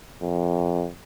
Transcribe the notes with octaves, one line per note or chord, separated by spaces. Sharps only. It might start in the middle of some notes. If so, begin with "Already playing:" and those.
F2